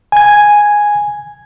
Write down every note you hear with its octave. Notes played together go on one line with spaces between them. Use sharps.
G#5 G#6